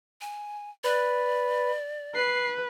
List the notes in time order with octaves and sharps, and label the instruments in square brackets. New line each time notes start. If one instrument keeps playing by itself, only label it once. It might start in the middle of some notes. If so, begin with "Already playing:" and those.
[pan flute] G#5
[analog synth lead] B4 [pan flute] D5
[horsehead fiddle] B4 [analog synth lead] C7